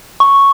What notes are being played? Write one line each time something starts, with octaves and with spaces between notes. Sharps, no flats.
C#6